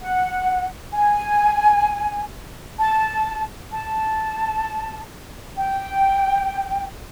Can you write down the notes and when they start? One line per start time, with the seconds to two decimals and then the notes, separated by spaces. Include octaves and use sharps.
0.02 F#5
0.93 G#5
2.79 A5
3.72 A5
5.56 G5